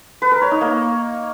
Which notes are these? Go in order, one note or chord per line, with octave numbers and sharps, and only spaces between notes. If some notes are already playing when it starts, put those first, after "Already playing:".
B4
A#4
C#5
D#4
A#3